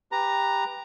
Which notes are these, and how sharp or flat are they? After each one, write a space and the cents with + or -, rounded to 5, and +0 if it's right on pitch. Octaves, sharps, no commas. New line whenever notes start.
G4 +10 B4 +0 A#5 +0